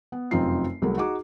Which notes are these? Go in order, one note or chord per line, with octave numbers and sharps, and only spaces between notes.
B3
F1 F#2 C4 D#4 F4 C7
C2 F#3 A3 G#4 A#4
D#4 F#4 G#4 D6